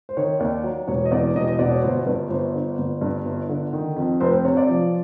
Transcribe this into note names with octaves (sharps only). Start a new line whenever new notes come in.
C5
D#3 C#5
D#2 D5
F#3
E1 C#5
D#5
E2 D5
E1 D#5
D#5
B2 D5
C#5
G1 C5
G2 B4
G1 C5
D3
G1
G2
G1
D3
D#3
F2
F1 C5
C5
C3 C#5
D5
F3